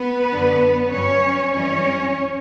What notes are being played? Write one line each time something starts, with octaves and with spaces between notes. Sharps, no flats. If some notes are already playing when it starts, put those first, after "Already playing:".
Already playing: B3 B4
F#2 D3 F#3
G2 F#3 C#4 C#5
F#2 E3 G3 C#4 C#5